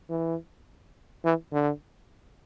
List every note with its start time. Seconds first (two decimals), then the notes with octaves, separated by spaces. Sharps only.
0.09 E3
1.25 E3
1.52 D3